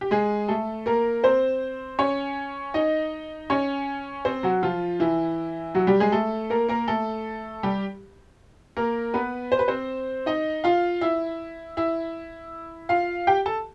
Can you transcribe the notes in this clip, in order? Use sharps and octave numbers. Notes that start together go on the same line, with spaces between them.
G4
G#3 G#4
A3 A4
A#3 A#4
C4 C5
C#4 C#5
D#4 D#5
C#4 C#5
C4 C5
F#3 F#4
F3 F4
E3 E4
F#3 F#4
G3 G4
G#3 G#4
A3 A4
A#3 A#4
A#3 A#4
A3 A4
G3 G4
A#3 A#4
B3 B4
C5
B4
C4 C5
D#4 D#5
F4 F5
E4 E5
E4 E5
F4 F5
G4 G5
A4 A5